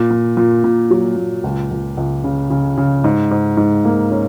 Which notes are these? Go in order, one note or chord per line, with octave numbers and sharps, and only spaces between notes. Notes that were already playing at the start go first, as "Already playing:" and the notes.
Already playing: A#2
A#2
A#2
A#2
F#3
A#2
C#2
C#2
C#2
C#3
C#3
C#3
G#2
G#2
G#2
A#3
C#4